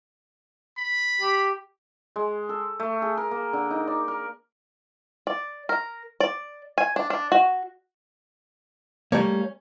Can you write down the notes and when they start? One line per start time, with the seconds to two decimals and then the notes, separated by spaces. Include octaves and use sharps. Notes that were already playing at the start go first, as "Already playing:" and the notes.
0.78 B5
1.21 G4
2.16 G#3
2.49 A4
2.80 A3
3.02 G#4
3.17 A#4
3.31 A#3
3.53 D3
3.71 D#4
3.87 D5
4.08 A#4
5.27 D5
5.69 A#4
6.20 D5
6.78 G#5
6.96 D4
7.10 D4
7.32 F#4
9.12 G3 A3 A#3 C#4